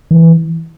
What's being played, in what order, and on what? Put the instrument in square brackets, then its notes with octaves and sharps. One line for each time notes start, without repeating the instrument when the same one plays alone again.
[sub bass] E3